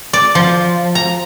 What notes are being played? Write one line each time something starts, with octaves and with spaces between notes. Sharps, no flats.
D5
F3
A#5